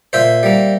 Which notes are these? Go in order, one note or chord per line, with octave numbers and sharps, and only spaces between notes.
A#2 C5 E5
G3 A#3